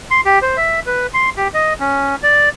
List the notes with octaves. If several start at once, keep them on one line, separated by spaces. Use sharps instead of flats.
C6
G4
C5
E5
B4
C6
G4
D#5
C#4
D5